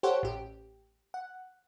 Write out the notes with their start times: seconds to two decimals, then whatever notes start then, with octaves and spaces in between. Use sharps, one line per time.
0.03 G4 A4 C5 C#5 F#5
0.23 A1 G4
1.14 F#5